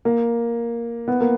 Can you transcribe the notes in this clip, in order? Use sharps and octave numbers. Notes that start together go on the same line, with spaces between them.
A#3
B3
A#3